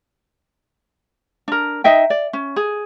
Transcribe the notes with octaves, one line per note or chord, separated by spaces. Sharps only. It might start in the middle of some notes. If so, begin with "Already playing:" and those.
D4 A#4
D#4 D#5 E5 G5
D5
C#4
G#4